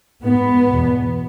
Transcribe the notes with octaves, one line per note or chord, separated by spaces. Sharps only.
G#2 B3
E2 B2